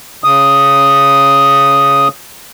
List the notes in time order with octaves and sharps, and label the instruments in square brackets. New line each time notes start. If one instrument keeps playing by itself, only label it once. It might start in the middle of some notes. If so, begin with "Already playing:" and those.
[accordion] C#3 D#6